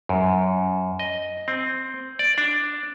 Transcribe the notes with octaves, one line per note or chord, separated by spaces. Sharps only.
F#2
D#5
C4
D5
D4